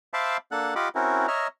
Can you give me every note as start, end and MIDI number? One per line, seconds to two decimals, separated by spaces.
0.14 0.37 72
0.14 0.37 76
0.14 0.37 77
0.14 0.37 81
0.14 0.37 83
0.14 0.37 86
0.52 0.74 58
0.52 0.74 62
0.52 0.74 69
0.52 0.74 78
0.52 0.74 90
0.76 0.89 65
0.76 0.89 67
0.76 0.89 75
0.76 0.89 78
0.76 0.89 83
0.76 0.89 86
0.95 1.27 60
0.95 1.27 61
0.95 1.27 64
0.95 1.27 66
0.95 1.27 70
1.28 1.47 73
1.28 1.47 75
1.28 1.47 76
1.28 1.47 82
1.28 1.47 89